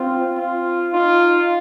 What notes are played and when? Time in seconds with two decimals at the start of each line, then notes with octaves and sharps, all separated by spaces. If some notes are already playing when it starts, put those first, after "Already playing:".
Already playing: C4 F4
0.37 F4
0.93 D#4 F4